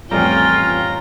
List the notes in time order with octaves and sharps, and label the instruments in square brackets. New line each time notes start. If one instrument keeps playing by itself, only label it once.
[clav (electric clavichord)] A1 F2 G3 [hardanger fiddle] C#4 G5 [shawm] F4 [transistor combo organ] A#5